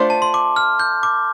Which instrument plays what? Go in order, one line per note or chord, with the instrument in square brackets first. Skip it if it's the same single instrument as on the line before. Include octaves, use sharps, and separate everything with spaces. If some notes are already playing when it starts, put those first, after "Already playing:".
Already playing: [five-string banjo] A3 D4 F4 C5
[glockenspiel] A5
C6
D6
F6
G6
D6